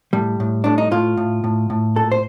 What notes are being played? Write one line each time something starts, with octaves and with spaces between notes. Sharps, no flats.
A2 G3
A2
A2 D4
D#4
A2 F4
A2
A2
A2
A#2 A4
C5